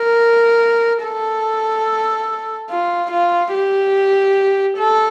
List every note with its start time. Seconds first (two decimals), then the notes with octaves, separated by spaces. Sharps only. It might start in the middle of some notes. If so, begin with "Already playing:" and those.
Already playing: A#4
1.04 A4
2.70 F4
3.12 F4
3.54 G4
4.78 A4